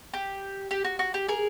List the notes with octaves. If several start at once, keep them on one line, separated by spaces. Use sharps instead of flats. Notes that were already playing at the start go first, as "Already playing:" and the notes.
G4
G4
F#4
F#4
G4
G#4 A#4